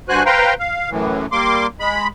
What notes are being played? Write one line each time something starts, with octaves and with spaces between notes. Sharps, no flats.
G2 F#4 C5 G#5 F#6
B4 C5 F5 G5 A#5 C6
F5
F#2 A2 E3
G3 A#3 C6 D6
G#3 B5